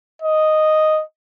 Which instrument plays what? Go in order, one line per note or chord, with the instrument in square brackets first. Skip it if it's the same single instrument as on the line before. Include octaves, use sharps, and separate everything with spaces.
[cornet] D#5